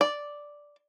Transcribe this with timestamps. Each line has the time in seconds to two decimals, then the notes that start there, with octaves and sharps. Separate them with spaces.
0.01 D5